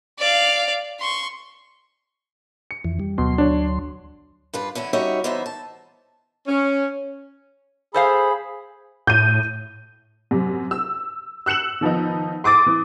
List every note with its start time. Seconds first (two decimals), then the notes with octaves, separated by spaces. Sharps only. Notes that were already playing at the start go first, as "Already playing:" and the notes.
0.19 D5 F5
1.00 C6 C#6
2.71 C#7
2.84 F2 E3
3.00 G3
3.18 D2 B2 F#3 C6
3.38 D4 C#5
4.54 G2 F4 B4
4.75 D3 E3 C#4 E4
4.93 G3 C#4 D#4 F#4 C#5 E5
5.24 E3 B3 D#4 C5 E5
5.46 A5
6.48 C#4
7.94 G#4 A4 C5 F5 B5
9.07 A2 G6 D#7
10.31 F#2 C3
10.71 E6
11.46 E6 F#6 C#7 E7 F#7
11.81 D#3 F3 B3 D#4
12.44 C6 D6 D#6 A6 D7
12.66 E3